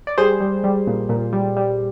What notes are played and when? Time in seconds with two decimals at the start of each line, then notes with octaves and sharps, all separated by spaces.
0.07 D5
0.18 G3 G#4 C5
0.40 G3
0.64 G3
0.87 A#2
1.09 A#2
1.33 G3
1.57 G3